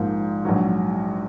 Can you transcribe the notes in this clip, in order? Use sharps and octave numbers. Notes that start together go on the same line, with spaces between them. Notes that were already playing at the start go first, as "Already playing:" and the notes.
Already playing: A#1 G#2 F3 A#3
A#1 G#2 F#3